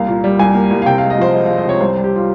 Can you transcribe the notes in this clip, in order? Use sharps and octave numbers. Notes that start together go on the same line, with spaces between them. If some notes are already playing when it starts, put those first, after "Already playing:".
Already playing: C2 A#3 F5
A#2
G3
C2 G#5
A#3
C2
F5
C3 G5
F5
G#3
D#5
F3 C5
G#3
F5
G#3
D#5
C3 C#5
C2 C5
G3
G4
F4